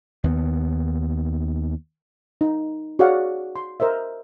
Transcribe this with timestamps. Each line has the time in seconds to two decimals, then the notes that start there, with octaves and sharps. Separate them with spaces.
0.24 D#2 B3
2.41 D#4
2.99 F#4 G#4 C#5 D5 F5 F#5
3.56 C6
3.80 A#4 C5 D#5 E5